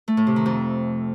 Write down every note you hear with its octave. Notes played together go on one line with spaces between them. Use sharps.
A3
A2
C3
D#3
F2